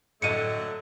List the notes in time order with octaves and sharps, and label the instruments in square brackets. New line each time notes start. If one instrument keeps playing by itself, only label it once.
[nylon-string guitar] A2 D#5 [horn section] D3 F#3 A3 [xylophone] C#7 D#7